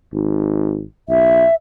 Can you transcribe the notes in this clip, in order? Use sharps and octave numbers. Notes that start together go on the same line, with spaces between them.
G#1
B1 E5